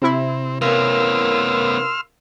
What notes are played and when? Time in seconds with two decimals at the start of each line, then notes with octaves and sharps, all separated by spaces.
0.02 C3 C4 E4
0.62 B3 C#4 A#4 F5 C6 E6 F6